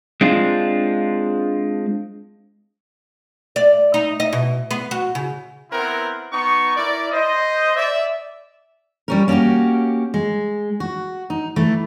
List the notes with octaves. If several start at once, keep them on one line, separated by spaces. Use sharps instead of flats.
G#3 C4 D4 F4
D5
D#4
D#5
B2
B3
F#4
C#3
B3 C4 E4 A#4 F#5
B3 D#4 C#6
E4 A#4 D5
C5 D#5
D5 E5
G3 C#4 A#4
A#3 C#4 D#4 F#4 G4
G#3
F#4
D#4
E3 A3 E4